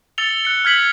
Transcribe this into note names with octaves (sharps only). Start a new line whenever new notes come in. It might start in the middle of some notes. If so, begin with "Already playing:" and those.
E6 A6 C#7 F7 G7
F#6 C#7
F6 G#6 B6 F#7